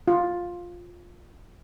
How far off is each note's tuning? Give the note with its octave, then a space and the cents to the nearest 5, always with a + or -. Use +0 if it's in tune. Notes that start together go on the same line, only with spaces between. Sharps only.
F4 +10